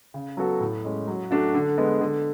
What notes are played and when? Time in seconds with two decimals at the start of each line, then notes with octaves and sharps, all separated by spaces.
0.14 C#3
0.37 F#3 B3 F#4 A4
0.60 A2
0.85 G#3 C#4
1.08 F#3
1.31 A3 D4 F#4
1.54 D3
1.78 G#3 B3
2.01 D3